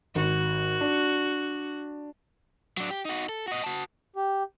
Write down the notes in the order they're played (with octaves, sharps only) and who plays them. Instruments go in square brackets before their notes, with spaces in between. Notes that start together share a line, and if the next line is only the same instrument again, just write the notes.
[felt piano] G#1 [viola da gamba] F#4
[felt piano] D4
[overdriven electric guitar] F#3 D4
G4
D#4 F#4
A4
F#4 D#5
F#4 A5
[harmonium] G4